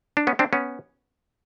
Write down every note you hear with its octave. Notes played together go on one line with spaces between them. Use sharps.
D4
B3 C#4
C4 D4
B3 C#4